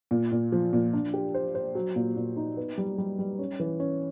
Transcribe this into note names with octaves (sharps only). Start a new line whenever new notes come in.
A#2
A#2
F3
A#2
D4
G4
C5
C5
F#3
A#2
A#2
D#4
B3
G3
G3
G3
C#4
E3
C#4